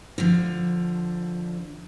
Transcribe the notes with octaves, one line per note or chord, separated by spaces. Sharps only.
D3 F3